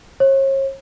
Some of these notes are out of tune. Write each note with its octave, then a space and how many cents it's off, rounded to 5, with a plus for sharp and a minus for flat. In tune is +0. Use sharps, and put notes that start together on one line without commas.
C#5 -40